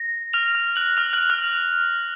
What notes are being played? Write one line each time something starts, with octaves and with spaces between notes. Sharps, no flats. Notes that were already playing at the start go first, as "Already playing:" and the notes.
Already playing: A#6
F6 F7
F6 F7
F#6 F#7
F6 F7
F#6 F#7
F6 F7